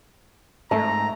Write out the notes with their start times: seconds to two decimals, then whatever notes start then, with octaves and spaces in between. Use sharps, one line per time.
0.71 G#2 A3 A5 A#5